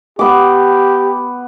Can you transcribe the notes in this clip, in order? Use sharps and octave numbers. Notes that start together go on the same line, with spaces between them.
B3 G4 D6